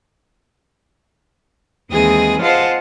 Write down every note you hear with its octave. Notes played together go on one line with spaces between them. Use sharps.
D#2 E3 G#3 C4 G#4 D#6
F4 C5 D#5 F5 F#5 A5